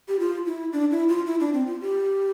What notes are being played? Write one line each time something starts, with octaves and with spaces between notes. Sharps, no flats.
G4
F4
E4
D4
E4
F4
E4
D4
C4
F4
G4